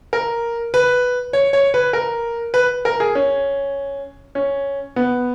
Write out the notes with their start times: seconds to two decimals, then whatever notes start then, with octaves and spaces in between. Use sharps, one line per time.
0.13 A#4
0.74 B4
1.33 C#5
1.53 C#5
1.74 B4
1.93 A#4
2.54 B4
2.85 A#4
3.00 G#4
3.15 C#4
4.35 C#4
4.96 B3